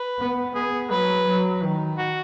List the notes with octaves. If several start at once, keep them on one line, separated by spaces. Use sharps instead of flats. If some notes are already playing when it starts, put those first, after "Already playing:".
Already playing: B4
B3
B3 G#4
F#3 B4
F#3
D#3
F#4